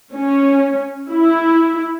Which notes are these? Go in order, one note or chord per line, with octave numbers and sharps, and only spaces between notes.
C#4
E4